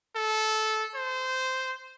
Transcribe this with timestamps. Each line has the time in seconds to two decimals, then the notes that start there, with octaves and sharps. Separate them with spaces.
0.16 A4
0.95 C5